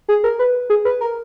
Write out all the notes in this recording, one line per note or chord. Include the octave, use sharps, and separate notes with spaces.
G#4
A#4
B4
G#4
B4
A#4